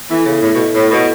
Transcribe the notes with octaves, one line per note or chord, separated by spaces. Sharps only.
E3 B3 E4 A4 E5
C#3
A2
B2
A2
B2